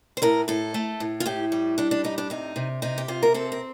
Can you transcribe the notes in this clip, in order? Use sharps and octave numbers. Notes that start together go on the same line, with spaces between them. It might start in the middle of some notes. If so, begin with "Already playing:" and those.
C5
A2 A#4
A2 A4
A3
A2
F4
A2 G4
G3
G3 D4
D4
A2 D#4
D4
C3 D#4
C3
C3 D#4
G4
C3 F4
A#4
C4 A4
A#4